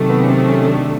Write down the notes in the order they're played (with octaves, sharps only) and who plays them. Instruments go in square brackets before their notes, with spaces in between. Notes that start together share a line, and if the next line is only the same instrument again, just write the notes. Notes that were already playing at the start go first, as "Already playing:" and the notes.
Already playing: [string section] C3 D#3 F#3 A3
[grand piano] B3
C#4
C4
C#4
D4